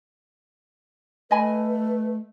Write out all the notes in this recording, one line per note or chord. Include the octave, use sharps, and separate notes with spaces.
A3 B4 D#5 G#5 B5